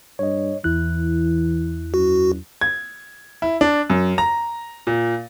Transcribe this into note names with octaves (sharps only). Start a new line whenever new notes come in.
G2 C#5 D#5
E2 E3 E4 F#6
F#2 F#4
G#6
E4
D4
F#2
A#5
A#2